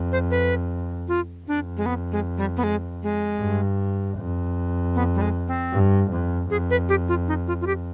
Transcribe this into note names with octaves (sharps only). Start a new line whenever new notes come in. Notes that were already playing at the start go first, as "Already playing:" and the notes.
Already playing: F2
C5
B4
F4
F2 D4
G#3
B3
G#3
G3
B3
G#3
G#3
G2
F2
B3
G3
G#3
C4
G2
F2
F2 G#4
B4
G4
F4
D#4
F4
F4
G4